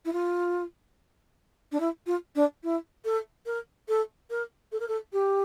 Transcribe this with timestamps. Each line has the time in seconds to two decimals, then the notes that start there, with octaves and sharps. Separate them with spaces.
0.05 E4
0.13 F4
1.72 D4
1.80 E4
2.07 F4
2.36 D4
2.63 E4
3.05 A4
3.46 A#4
3.88 A4
4.30 A#4
4.72 A4
4.80 A#4
4.88 A4
5.13 G4